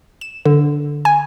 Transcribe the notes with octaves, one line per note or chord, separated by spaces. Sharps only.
E7
D3
G#5